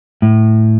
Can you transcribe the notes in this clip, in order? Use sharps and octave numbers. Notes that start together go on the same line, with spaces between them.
A2